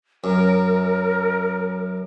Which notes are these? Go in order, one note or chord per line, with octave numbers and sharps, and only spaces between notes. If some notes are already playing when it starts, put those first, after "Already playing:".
F#2 A#4